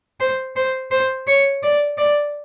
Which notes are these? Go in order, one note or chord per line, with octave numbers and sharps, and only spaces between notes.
C5
C5
C5
C#5
D5
D5